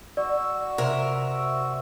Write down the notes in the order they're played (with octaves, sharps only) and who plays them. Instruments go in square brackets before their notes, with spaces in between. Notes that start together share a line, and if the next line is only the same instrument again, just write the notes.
[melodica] F#4 E6 [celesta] D5
[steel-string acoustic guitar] C3 A#4 E5